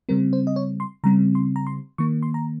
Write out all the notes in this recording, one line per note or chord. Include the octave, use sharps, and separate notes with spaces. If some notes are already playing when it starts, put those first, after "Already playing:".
C#3 G3 C4 A#4
C5
D#5
C#5
C6
C#3 G3 C4 A#5
C6
A#5
C6
D#3 A#3 C#6
C6
A#5